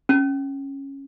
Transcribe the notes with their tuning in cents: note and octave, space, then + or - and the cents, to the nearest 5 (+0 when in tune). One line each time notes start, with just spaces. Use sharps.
C#4 -10